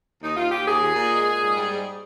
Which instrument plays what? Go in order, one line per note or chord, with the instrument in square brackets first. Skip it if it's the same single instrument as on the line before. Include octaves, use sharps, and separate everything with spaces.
[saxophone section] D#2 D#4
D#2 F4
D#2 G4
D#2 G#4
A#2
A#2
G#3
A#2
G#2
G3
G#2